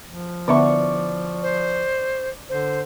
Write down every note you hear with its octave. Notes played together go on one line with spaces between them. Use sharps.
F3
D3 B3 D5 E5 C#6
C5
D3 C5